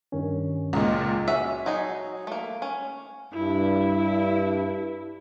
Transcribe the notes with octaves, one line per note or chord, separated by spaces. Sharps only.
G2 D#3 C#4
C#2 A#2 D#5 A#5
C#4 F#4 E5
F#3 D#4 G#4
A3 A#3
C#4
G2 E4